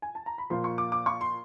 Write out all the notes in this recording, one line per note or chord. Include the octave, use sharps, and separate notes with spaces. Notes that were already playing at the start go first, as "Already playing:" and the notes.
G#5
A5
A#5
B5
A#2 F3 A#3 C6
C#6
D6
D6
C#6
C6